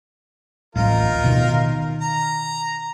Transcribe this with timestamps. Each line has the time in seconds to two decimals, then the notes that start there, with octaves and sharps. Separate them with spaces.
0.76 D1 A1 D#4 F4 A#4
1.24 B2 D#3
2.01 A#5